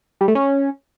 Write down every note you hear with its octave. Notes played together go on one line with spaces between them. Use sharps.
G3
A3
C#4